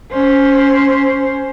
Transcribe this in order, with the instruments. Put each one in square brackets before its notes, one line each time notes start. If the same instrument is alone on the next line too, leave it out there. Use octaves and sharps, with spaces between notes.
[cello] C#4 C5